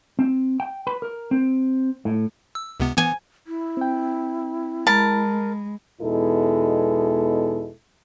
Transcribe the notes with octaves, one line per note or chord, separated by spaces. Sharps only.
C4
G5
B4
A#4
C4
A2
E6
C#2 C3 B3
E3 B3 G#5
E4
C4 G5
G#3 A#4 A5 B5
E2 B2 G#3 D#4 E4 A4